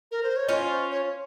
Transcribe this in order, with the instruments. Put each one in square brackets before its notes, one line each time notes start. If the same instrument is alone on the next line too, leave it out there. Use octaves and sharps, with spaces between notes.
[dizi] A#4
C5
C#5
[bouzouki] C#4 F4 [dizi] D#5
[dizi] C5
C#5